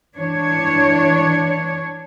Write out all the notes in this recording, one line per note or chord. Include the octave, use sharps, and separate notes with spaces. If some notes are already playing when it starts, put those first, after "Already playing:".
E3 D4 C#5